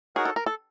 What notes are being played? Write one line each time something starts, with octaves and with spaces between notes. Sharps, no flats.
D#4 F#4 G#4 A#4 C#5 F#5
A4
A#4
A4